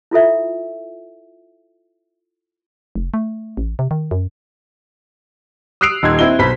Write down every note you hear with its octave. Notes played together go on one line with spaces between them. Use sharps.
E4 F4 A4 E5
F1
A3
A1
C3
D#3
F#2
D#6 E6 F#6 C7 D7 F7
D#1 D#4 C6 G#6
C4 E4 D#5 G7
B1 C5 B5 B6